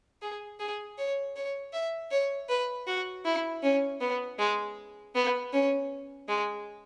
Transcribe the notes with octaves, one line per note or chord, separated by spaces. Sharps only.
G#4
G#4
C#5
C#5
E5
C#5
B4
F#4
E4
C#4
B3
G#3
B3
C#4
G#3